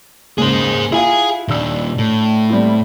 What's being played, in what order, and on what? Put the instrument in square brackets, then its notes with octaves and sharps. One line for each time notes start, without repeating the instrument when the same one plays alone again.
[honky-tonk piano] D#2 G#2 C#3 [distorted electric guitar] G#4 C5
[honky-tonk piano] E4 F4 F#5 [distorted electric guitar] G#4 G#5
[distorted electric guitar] A#2 D#3 [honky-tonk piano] D4 E6
[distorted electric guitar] A2
[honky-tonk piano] G3 C4 E4